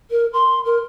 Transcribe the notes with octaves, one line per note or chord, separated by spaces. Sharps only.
A#4
C6
A#4